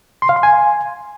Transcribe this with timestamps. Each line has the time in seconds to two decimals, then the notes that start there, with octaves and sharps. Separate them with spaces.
0.22 C6
0.29 F5
0.36 C6
0.43 G#5